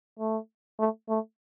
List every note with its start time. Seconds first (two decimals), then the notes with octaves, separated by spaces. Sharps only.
0.19 A3
0.79 A3
1.09 A3